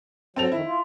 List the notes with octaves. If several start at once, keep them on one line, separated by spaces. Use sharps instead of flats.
F#3 C4 A4 F7
F2 D#3 E4
F4